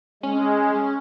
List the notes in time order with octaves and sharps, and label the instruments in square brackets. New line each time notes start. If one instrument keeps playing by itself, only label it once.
[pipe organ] G#3 [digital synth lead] C#4